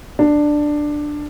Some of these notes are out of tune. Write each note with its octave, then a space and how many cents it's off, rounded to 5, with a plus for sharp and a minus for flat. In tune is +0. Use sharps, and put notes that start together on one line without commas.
D4 +10